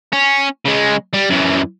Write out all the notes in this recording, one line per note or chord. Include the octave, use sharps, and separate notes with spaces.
C#4
C#3 G#3
G3
F#2 E3